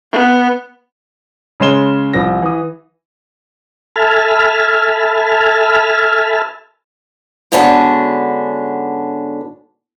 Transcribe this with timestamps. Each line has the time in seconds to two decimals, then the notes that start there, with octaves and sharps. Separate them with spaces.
0.12 B3
1.60 C#3 G#3 C#4 C6 E7 G7
2.13 C2 F3 A#6
2.42 E3 D#6
3.96 A4 E5 G#5 A5 B5 F6
7.52 G#2 D3 B3 C#4 D4 F#4